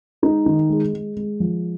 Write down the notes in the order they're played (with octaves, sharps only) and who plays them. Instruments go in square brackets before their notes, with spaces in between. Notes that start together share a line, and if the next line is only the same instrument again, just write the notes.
[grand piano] G#3 D#4
D#3
G#3
G#3
G#3
F3